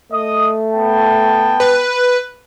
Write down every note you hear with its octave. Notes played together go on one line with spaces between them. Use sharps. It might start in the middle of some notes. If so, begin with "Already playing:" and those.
A3 D#5 D#6
B3 G5 A5
B4